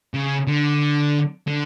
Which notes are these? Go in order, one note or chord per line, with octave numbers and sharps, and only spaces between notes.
C#3
D3
D3